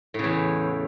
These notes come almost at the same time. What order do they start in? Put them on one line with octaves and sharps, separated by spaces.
A2 C#3 E2